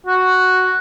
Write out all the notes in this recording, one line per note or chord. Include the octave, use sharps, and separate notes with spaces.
F#4